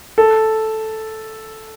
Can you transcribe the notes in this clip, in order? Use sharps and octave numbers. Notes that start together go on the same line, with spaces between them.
A4